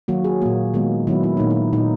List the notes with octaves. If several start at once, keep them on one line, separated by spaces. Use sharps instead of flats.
D#3 F#3 A#3 F#4
G#4
A#2 A#3 F#4
D#3 G#3 B3
D#3 F#3 B3 E4
E4
A#2 A#3 D#4
E4
A#2 A#3 D#4